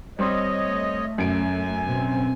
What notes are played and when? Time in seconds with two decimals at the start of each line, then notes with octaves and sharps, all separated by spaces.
0.19 G3 C4 C#5 D#5 C6
0.64 A3
1.18 F#2 G#5 D7
1.86 B2 C4